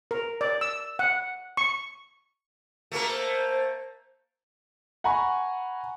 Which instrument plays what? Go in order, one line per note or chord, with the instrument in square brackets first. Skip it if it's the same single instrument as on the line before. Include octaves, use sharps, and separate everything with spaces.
[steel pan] A#4
D5
E6
F#5
C#6
[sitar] A3 A#3 A#4
[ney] C5
[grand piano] F#5 G#5 A#5 B5 C#6